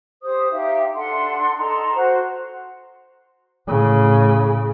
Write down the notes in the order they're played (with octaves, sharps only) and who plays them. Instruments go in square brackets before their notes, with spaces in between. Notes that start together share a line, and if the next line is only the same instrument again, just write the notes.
[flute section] G4 C5 D#6
D#4 G4 E5 F5
D4 A4 F#5 C6
D#4 A4 A#5 C6
F#4 C5
[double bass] A2 C#3